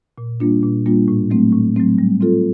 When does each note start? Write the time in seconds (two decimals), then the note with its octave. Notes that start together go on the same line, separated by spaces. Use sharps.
0.18 A#2
0.40 G3 A#3 D4 F4
0.63 A#2
0.86 G3 A#3 D4 F4
1.08 A2
1.31 F#3 A3 C4
1.53 A2
1.76 F#3 A3 C4
1.98 G3
2.21 C4 F4 A4